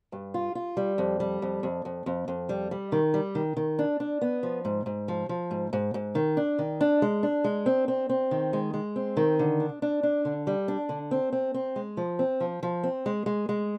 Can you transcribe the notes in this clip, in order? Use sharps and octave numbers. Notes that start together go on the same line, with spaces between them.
G2
F4
F4
G3
F2
G3
F2
F2
F2
F2
F2
G3
G3
D#3
G3
D#3
D#3
D4
D4
B3
F3
G#2
G#2
F3
F3
G#2
G#2
G#2
D#3
D4
D#3
D4
G#3
D4
G#3
C4
C4
C4
D#3
G#3
G#3
C4
D#3
D3
D4
D4
D4
D3
G3
D4
D3
C4
C4
C4
G#3
F3
C4
F3
F3
C4
G#3
G#3
G#3